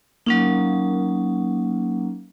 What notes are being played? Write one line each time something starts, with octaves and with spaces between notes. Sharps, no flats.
F#3 A#3 C#4 D#4